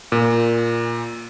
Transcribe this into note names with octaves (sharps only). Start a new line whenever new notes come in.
A#2